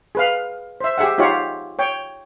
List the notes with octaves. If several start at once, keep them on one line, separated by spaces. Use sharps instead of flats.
G#4 B4 F5
C5 E5
G4 G#4 E5 F#5
D#4 F4 G4 C#5 F#5
C#5 G5